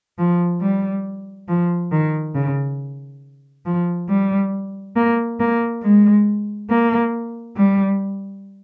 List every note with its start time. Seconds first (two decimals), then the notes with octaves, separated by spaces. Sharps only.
0.19 F3
0.61 G3
1.48 F3
1.92 D#3
2.35 C#3
3.66 F3
4.09 G3
4.96 A#3
5.40 A#3
5.83 G#3
6.70 A#3
7.56 G3